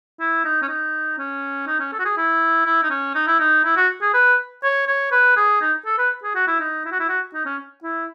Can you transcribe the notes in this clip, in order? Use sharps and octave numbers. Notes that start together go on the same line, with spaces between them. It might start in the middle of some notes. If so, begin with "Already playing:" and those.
E4
D#4
C#4
D#4
C#4
D#4
C#4
A4
F#4
G#4
E4
E4
D#4
C#4
D#4
E4
D#4
E4
F#4
G#4
B4
C#5
C#5
B4
G#4
D#4
A4
B4
G#4
F#4
E4
D#4
E4
F#4
E4
F#4
D#4
C#4
E4